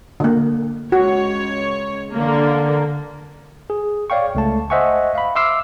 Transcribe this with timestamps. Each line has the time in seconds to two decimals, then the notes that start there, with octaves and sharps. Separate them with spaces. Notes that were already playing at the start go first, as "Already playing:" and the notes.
0.20 D3 A#3
0.92 C#2 F#4 C#5
2.14 D3 A#3
3.70 G#4
4.10 C#5 D5 F5 G5 C#6
4.35 C#2 A3 A5
4.70 C5 D#5 E5 F#5 G#5 C#6
5.15 F5 B5
5.35 E5 C6 D6 E6 F6 C7